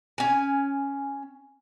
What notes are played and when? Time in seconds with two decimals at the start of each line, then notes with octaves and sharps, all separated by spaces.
0.18 C#4 G#5